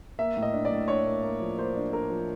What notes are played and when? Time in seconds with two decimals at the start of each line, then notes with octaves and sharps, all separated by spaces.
0.19 A#3 E5
0.37 A2
0.42 D#5
0.53 D4
0.65 D5
0.72 A2
0.88 D4 C#5
1.06 A#3
1.23 A#3
1.40 F3
1.58 A#3 C5
1.76 D4
1.93 D4 A#4
2.10 F3